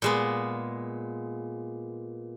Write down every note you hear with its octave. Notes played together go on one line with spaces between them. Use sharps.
A#2 G#3 B3